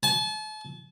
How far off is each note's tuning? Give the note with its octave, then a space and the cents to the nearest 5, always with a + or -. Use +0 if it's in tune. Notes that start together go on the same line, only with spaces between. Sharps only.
A5 -40